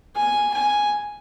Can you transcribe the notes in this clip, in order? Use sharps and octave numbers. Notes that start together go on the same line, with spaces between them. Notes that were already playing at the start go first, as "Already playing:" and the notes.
G#5
G#5